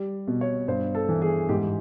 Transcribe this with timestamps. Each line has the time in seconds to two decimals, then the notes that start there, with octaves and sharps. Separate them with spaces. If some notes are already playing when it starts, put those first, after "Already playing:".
Already playing: G3
0.27 B2
0.41 C#5
0.68 G2 C5
0.95 A4
1.09 E3
1.22 G#4
1.49 G#2 G4